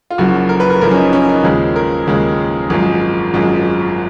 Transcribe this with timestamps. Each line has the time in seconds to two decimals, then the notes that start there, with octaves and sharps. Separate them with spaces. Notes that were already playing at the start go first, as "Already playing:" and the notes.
0.10 F4
0.18 F#1 F#2 F3 F#4
0.49 A#4
0.60 B4
0.70 A#4
0.81 F#1 F#2 F3 A#4
0.91 C#4
0.97 D#4
1.13 C#4
1.29 D#4
1.44 D#2 C#3 F3 G#3
1.76 A#4
2.07 D#2 C#3 F3 G#3
2.70 G#1 F#2 F3 G#3
3.34 G#1 F#2 F3 G#3